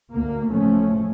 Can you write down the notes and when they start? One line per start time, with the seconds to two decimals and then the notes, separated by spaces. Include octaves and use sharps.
0.14 D2 A#3
0.50 F#1 A2 F3 A3 C#4